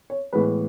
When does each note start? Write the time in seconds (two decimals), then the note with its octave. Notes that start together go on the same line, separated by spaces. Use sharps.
0.10 C#5
0.33 A2 E3 G#3 B3 B4